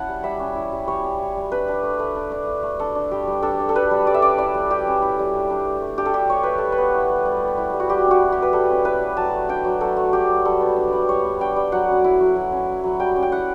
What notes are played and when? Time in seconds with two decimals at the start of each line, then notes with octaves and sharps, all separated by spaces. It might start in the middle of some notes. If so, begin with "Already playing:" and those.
Already playing: C#4 E4 F#5 A5
0.08 G3
0.23 G3 E5
0.39 C#4
0.56 E4
0.72 G3
0.87 G3 C#5
1.04 C#4
1.19 E4
1.36 G3
1.52 D4 B4
1.68 D4
1.83 A3
1.99 A3
2.15 D4
2.32 D4
2.47 A3
2.63 A3
2.79 D4 A4
2.95 D4
3.11 G3 G4
3.27 G3
3.42 D4 A4
3.59 D4
3.69 A4
3.75 G3 B4
3.91 G3
4.07 G3 D5
4.14 E5
4.22 C#4 D5
4.38 E4 D5
4.54 G3
4.70 G3 G4
4.87 C#4
5.02 E4
5.19 G3
5.34 D4
5.50 D4
5.66 A3
5.82 A3
5.98 D4 G4
6.06 A4
6.14 D4 G4
6.30 A3 C#5
6.43 A3 B4
6.58 G3 A4
6.72 B4
6.78 B3
6.95 E4
7.10 G3
7.25 G3
7.42 B3
7.58 E4
7.74 G3
7.80 F#4
7.89 G3 G4
8.05 C#4
8.11 F#4
8.22 E4
8.32 G4
8.37 G3 B4
8.53 G3 A4
8.70 C#4
8.85 E4 B4
9.01 G3
9.17 F#3 A5
9.34 A3
9.49 D4 G5
9.65 F#3
9.81 F#3 A4
9.97 A3
10.13 D4 G4
10.29 F#3
10.45 G3 A4
10.61 B3
10.76 D4
10.92 G3
11.09 G3 C#5
11.24 B3
11.40 D4 G5
11.56 G3
11.72 F#3 F#5
11.88 C#4
12.04 E4
12.21 F#3
12.36 F#3
12.52 C#4
12.68 E4
12.84 F#3
13.00 G3 G5
13.16 C#4
13.23 G5
13.32 E4 F#5